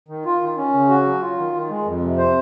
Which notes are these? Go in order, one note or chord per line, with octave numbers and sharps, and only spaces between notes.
D#3
F4
D#3
C#4
C#3
F#4
F#3
F4
D#3
D#3
G#3
F2
C3
C5